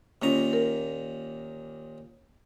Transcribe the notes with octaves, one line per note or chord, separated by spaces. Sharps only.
D#2 A#2 A#3 C#4 F4 A#5
A#4